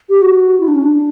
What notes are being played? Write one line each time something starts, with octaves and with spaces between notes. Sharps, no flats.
G4
F#4
E4
D4
C#4
D4